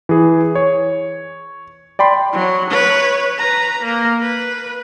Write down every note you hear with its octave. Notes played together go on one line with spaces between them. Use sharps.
E3 G#4
C#5
D5 G5 B5 C6
F#3
B4 C#5
B4 A#5
A#3
B4